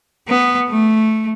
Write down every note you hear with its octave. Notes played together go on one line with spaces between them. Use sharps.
B3
A3